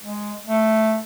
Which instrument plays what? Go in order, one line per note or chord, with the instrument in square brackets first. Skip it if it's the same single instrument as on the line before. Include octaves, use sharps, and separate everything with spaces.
[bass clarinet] G#3
A3